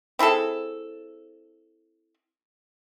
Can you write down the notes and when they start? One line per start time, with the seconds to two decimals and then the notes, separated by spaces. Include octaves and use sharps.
0.19 C4 E4 G#4 A4